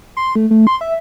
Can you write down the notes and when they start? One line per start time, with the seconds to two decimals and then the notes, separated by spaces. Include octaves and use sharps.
0.17 C6
0.36 A3
0.51 A3
0.67 C6
0.81 E5